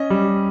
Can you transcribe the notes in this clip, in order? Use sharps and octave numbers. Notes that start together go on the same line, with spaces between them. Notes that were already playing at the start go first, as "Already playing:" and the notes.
Already playing: C#4 D#5
G3